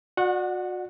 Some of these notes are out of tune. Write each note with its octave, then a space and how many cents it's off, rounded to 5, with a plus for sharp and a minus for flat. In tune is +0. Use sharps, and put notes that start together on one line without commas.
F#4 -35 D5 +25 F#5 +0